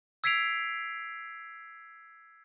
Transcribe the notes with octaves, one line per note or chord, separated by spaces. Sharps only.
E6 G#6 B6 C7 D7 F7